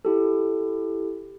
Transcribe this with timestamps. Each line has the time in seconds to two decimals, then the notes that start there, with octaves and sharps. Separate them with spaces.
0.05 E4 G4 A4